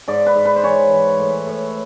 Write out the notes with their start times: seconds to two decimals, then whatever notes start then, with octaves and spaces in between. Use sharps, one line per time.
0.08 G#2 D5
0.26 B4
0.35 G#2
0.45 B4
0.56 C5
0.63 E3 C#5
0.91 E3
1.19 A2
1.47 A2